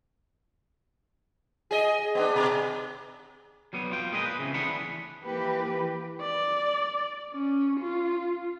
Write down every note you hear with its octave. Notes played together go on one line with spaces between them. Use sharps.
G#4 D#5
B3 D4
B2
F#3 G3 B3
F4 G5
A#2 G#3 G#4 B4 D#5
B4
C#3 E3 C4
E3 A3 D4 G#4 F#5 B5
E3 A#3 G4 B4
D5
C#4
F4